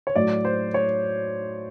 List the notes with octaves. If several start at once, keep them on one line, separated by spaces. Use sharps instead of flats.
C#5
A2 F#3 D5
C5
C#5